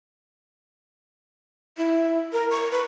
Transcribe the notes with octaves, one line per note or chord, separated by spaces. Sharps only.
E4
A#4
C#6
B4